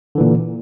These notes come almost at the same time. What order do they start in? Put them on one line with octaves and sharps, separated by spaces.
D3 E3 A#2